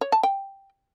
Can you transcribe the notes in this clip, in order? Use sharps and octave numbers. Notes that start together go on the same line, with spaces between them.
C#5
A5
G5